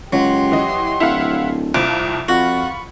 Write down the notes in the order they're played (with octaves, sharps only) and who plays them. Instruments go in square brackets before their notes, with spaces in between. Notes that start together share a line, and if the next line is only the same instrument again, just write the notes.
[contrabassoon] C#2 [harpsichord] F#3 [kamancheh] G4 C6
[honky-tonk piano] E3 D#5
[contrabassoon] D1 [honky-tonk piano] E4 F5 F#5
[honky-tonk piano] C2 F2 F3 [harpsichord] D6
[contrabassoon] F2 [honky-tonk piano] F4 [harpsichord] F#4 [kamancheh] B5 C#6